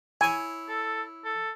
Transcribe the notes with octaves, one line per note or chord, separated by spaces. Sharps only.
E4 C#5 G#5
A4
A4